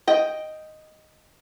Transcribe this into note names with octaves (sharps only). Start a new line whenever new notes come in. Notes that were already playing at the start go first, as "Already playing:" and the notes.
D#5 G5